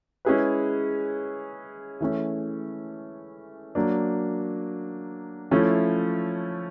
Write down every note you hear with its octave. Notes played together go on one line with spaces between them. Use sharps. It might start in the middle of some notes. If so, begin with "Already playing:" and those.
G#3 C#4 E4 G#4 B4
E3 A3 C#4
F#3 A#3 D4
F3 A3 C#4 E4